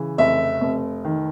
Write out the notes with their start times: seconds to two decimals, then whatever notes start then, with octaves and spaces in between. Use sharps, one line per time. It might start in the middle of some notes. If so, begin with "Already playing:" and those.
Already playing: C#3 E3
0.18 F1 E5
0.61 F1
1.05 D#3